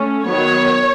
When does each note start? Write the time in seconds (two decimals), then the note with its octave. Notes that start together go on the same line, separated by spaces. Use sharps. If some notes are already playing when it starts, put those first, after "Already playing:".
Already playing: A3 C#4
0.26 D#3 F#3 B3 C#5